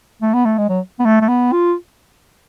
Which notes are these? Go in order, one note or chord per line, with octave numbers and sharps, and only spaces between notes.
A3
B3
A3
G#3
F#3
B3
A3
A3
B3
F4